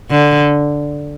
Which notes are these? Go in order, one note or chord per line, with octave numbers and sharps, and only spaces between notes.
D3